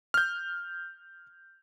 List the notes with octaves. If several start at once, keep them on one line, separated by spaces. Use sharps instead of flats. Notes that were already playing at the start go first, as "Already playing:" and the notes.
F6 G6